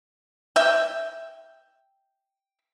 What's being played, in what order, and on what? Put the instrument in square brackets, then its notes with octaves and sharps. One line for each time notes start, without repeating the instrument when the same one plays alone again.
[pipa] E5 G5